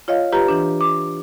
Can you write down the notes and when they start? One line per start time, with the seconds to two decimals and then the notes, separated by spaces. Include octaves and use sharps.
0.08 F4 C#5 D#5 F5
0.33 F4 G4 B4 A#5
0.48 E3 D4
0.81 D6